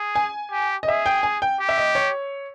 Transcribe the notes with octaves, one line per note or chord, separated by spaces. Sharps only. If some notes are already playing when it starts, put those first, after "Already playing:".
Already playing: G#4
G#5
G4
D#5
G#4 E5
G5
G#5
G5
G4
E5
D#5
C#5